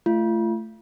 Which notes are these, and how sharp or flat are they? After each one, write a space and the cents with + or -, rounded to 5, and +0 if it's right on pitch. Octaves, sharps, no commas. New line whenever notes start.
A3 +0 F4 -35